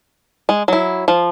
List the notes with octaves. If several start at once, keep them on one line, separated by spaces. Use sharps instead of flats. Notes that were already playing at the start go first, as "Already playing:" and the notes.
G#3
F#3 E4
F3